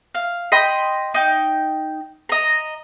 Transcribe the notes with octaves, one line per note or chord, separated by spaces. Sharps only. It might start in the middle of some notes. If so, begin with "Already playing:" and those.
F5
D#5 G5 B5 C6
D#4 G5
D#5 A#5